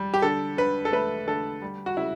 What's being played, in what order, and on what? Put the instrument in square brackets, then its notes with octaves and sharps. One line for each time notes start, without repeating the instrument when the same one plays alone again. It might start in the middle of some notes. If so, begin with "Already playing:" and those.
Already playing: [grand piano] G3
G4
D3 A4
D3 B4
A4
A3 B4
D3 A4
G3
F#4
C#3 E4